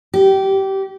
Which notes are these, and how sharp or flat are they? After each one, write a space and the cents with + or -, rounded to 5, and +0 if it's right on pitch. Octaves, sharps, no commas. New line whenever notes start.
G4 -20